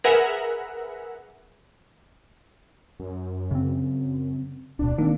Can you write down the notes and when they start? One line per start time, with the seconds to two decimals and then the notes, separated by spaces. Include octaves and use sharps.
0.04 G#4 A#4 B4 E5 F#5 A#5
3.00 F#2
3.51 C#3 C4
4.79 D1 B2 D4
4.98 D#3 A#3 C4